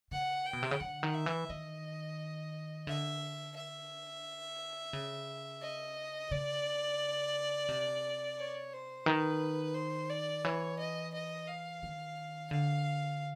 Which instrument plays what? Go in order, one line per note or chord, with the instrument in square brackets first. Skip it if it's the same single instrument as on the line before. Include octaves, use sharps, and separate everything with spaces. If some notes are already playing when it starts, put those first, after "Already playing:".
[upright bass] C#3 [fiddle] F#5
[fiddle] G5
[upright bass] B2
C3
C#3
[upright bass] D3 [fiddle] F#5
[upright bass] D#3
[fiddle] E5
[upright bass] E3
[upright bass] D#3 [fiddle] D#5
[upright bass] D3 [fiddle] E5
[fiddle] E5
[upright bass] C#3
[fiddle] D#5
[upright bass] C#3 [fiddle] D5
[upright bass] C3
[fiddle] C#5
C5
[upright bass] D#3 [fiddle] B4
[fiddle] C5
D5
[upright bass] E3 [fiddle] C#5
[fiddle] D#5
D#5
F5
[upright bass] D#3
[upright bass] D3 [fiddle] F5